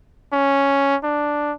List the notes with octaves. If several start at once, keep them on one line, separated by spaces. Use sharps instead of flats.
C#4
D4